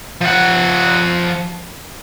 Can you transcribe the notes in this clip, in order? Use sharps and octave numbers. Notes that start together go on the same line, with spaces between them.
F3 F#5